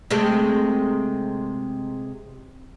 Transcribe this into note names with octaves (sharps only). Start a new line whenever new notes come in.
C3 G#3 A3